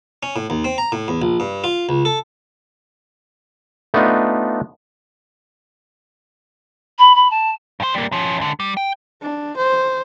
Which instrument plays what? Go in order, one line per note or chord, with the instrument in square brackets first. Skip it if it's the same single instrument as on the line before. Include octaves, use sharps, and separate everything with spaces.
[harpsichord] C#4
A2
D#2
C4
A#5
A2
E2
A#1
G2
F4
C#2
A4
[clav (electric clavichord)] A3 B3 D4 D#4 F4
[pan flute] B5
B5
A5
[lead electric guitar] G2 C5
G3 A#3
F3 C#4
C#2 D3
G3
G5
[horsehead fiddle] D4
C5